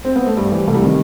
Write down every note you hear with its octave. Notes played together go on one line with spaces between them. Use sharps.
C4
B3
A3
G2 G3
E3 G3
C2 A3
G3
C3 D#3